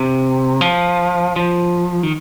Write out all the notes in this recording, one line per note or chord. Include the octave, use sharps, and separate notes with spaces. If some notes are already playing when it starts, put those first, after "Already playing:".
Already playing: C3
F3
F3
D#3